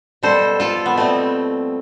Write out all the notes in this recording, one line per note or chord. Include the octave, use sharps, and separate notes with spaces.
B2 G3 A4 C5
F4 A4
B3
B2 G3 A3 C4